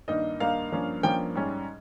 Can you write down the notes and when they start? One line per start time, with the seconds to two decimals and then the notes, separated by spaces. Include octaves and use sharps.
0.08 G2 D#3 A#3 D#4 D#5
0.40 G2 D#3 A#3 D#4 F5
0.72 G2 F3 A#3 C#4
1.03 G2 F3 A#3 C#4 G5
1.35 G#2 G3 C#4